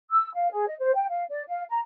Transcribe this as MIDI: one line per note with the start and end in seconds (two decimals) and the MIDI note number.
0.10 0.29 88
0.34 0.51 77
0.52 0.67 68
0.67 0.74 75
0.79 0.93 72
0.94 1.08 79
1.09 1.23 77
1.29 1.43 74
1.48 1.64 77
1.70 1.79 82